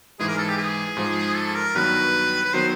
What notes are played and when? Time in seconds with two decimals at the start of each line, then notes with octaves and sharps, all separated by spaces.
0.19 G#2 E3 G#3 G#4
0.28 A#4
0.38 A4
0.48 G4
0.58 G#4
0.97 G#2 F3 G#3
1.36 A4
1.55 A#4
1.75 G2 D#3 F#3 B3 B4
2.45 B4
2.53 D#3 F#3 B3 C5